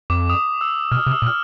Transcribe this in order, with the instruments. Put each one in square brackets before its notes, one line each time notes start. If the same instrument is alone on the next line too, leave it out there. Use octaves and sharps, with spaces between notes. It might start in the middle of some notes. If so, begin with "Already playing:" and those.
[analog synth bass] F2 [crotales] D6
[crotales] D#6
E6
[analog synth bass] B2 [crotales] F6
[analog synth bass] C3
[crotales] E6
[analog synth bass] A#2
[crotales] F6